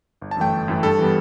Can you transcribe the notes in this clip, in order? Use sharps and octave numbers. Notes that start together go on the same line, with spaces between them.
G1
A5
F#2 E3 A3 G5
G1
F#2 E3 A3
G2 A4
E3 G3 B3